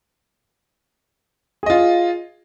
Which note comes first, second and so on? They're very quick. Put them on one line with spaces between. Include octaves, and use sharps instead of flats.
G#4 D#5 F4